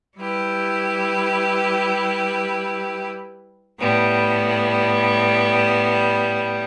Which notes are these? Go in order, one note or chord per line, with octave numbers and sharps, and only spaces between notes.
G3 E4 G4 B4
A2 G3 B3